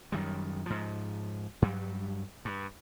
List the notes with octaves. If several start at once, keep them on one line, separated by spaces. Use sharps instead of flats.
F#2 D#3 G3
G#2 F3
G2 F#3 G3
G2